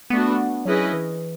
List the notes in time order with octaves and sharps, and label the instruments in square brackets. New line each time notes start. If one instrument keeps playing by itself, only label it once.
[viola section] A3 D4 F#4 [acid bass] B3
[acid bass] F#3 [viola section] C#4 E4 G#4 B4 D#5
[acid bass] E3